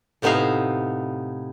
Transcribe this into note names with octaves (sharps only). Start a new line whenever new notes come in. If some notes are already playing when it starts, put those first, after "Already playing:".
A2 C3 B3 D#4 E5 F5